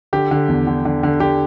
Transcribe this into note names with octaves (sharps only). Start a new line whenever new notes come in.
D3 G4
D3
E2
D3
D3
D3
D3 G4